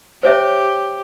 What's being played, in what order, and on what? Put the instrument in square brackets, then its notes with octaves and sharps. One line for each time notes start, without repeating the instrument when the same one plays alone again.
[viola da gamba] G4 [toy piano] C5 C#5 E5